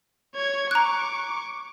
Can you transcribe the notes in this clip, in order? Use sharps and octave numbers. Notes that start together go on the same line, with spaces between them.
C#5 G#6
A#5 C#6 D6 F#6